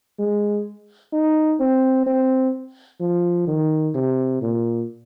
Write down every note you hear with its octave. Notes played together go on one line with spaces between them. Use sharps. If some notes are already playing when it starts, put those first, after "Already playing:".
G#3
D#4
C4
C4
F3
D#3
C3
A#2